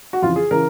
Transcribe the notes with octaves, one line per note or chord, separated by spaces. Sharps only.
F#4
F2 C#3 E3 F4
G#4
C#3 E3 A#4